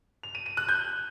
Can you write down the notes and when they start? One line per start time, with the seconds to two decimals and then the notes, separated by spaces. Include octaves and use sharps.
0.23 F7
0.35 D#7
0.46 D#7
0.57 F#6
0.69 G6